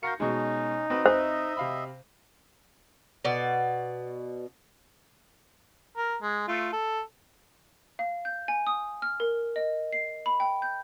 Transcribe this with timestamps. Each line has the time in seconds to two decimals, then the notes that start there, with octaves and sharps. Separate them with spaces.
0.03 F#4 A#4 F5 G6 A#6 C#7
0.20 B2 G#3 C#4 D#4
0.90 C4 F#4 B4 D#5
1.06 C5 D#5 E5
1.57 C3 F5 B5
3.25 B2 D5
5.97 A#4
6.22 G#3
6.48 A3 F4
6.73 A4
7.99 F5
8.25 G6
8.48 G#5
8.67 D#6
9.02 F6
9.20 A#4
9.56 D#5
9.93 C7
10.26 B5
10.40 G5
10.62 G6